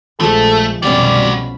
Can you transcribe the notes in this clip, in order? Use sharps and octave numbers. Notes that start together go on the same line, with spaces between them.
A#1 F3 G#3 A3 A4
C2 F2 B2 G3 C#4 F#4 D5 F5
B5